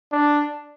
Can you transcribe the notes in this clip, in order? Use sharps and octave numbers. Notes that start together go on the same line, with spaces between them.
D4